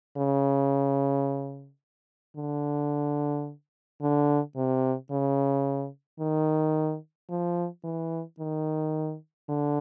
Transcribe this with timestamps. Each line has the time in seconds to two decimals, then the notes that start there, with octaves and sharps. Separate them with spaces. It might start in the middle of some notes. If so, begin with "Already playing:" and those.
0.17 C#3
2.37 D3
4.01 D3
4.56 C3
5.11 C#3
6.20 D#3
7.29 F3
7.84 E3
8.39 D#3
9.49 D3